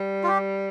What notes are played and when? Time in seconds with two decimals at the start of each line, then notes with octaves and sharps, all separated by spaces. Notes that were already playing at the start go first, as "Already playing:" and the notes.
Already playing: G3
0.23 F4
0.28 G4